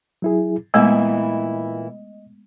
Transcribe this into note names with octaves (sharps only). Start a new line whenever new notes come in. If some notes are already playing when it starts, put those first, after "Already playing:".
F#3 E4 G#4
A#2 E3 G#3 A3 B3 E4 D#5